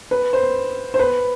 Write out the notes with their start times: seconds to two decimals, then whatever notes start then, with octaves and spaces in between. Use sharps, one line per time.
0.11 B4
0.33 C5
0.94 C5
0.99 B4